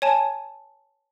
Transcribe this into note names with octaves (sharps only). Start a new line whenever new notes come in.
C#5 G#5 A5